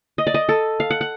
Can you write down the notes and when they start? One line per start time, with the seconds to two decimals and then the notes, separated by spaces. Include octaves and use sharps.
0.18 D#5
0.27 D5
0.34 D#5
0.49 A4
0.80 F5
0.90 F#5
1.01 F#5